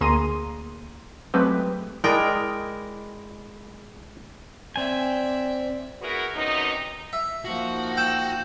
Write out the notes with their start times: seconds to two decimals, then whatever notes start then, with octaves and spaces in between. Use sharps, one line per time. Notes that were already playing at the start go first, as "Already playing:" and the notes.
0.01 D2 A#3 G#4 A#5 C6 D#7
1.34 F#3 G#3 A3 C4 G4 B4
2.04 G#3 E4 A#4 D5 D#5 G5 B5
4.76 C4 D5 E5 G#5
6.02 B3 E4 F#4 G#4 A#4 B4
6.36 F#2 C3 B3 D#4
7.13 E5
7.45 F3 A#3 D#4 F#4
7.97 G5 E6 G6 E7